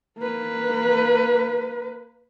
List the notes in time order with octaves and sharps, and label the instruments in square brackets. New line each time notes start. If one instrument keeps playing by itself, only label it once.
[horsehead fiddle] A#3 B4